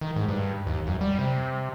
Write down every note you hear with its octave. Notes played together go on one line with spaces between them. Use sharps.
D#3
G#2
G2
D#2
F#2
G3
C3